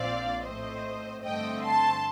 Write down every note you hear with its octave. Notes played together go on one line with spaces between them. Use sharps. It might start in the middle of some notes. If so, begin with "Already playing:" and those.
Already playing: A#1 A#2 C4 D5 F5
A2 A3 C4 C5 D#5
G2 D3 A3 C4 D#5 G5
A5 C6